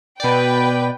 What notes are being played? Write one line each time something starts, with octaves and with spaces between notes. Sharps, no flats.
B2 B4 D5 G5